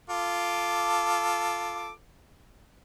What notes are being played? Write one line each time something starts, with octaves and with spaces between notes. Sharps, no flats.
F4 A4 D6